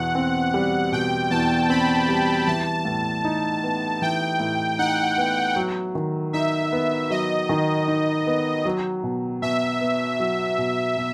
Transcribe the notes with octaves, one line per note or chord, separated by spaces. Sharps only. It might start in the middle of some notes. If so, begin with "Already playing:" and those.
Already playing: E2 B2 F#5
C4
G3
B2 G5
E2 A5
C4 B5
G3
E3 A5
A2
D#4
B3
E3 G5
A2
D#4 F#5
B3
F#3
D#3
D#4 E5
B3
F#3 D#5
D#3
D#4
B3
F#3
B2
B2 E5
B3
F#3
B2
B2